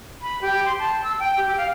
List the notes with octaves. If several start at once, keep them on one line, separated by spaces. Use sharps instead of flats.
B5
G4
C6
A5
E6
G5
G4
F5